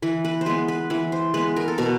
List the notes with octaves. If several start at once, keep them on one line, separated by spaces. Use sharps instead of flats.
E3 B4
B4
C5
G#3 B3 B4
B4
E3 B4
C5
G#3 B3 B4
A#4
A4
B2 A#4